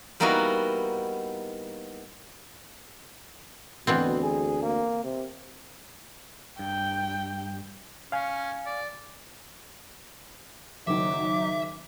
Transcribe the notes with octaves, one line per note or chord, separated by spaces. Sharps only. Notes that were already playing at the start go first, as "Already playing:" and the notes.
G3 A#3 B3 D#4 E4 F#4
D2 B2 E3 B3 C4
G#4
A#3
C3
G2 G5
C#4 F5 G#5
D5
F#1 D#3 F#3 D#4 E5 D6